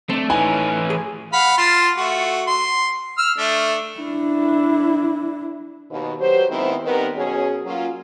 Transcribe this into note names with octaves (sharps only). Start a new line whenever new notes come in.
A3 C4 D4
A2 E3 C#4 D#4 G#5
G#4
F5 F#5 B5
F4 A5 C6
A3 F#4
C6
E6 F6
A3 D4
D4 E4
D#2 B2
F#3 G4 B4 C5
D#3 G#3 B3 C4 E4
D#3 G3 B3 C4 A#4 B4
B2 F#3 C#4 G#4
F#3 A#3 C#4 F4